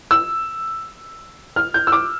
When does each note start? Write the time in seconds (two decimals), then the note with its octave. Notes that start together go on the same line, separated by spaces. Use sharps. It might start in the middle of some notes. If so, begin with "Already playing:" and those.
0.11 E6
1.56 F6
1.74 G6
1.87 E6
1.92 D6